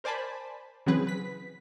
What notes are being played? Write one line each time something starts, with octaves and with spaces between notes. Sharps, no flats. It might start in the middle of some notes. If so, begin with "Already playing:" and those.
A#4 C5 D5 G#5 A5 B5
C#3 E3 F#3 C4 G#4 B4
B4 B6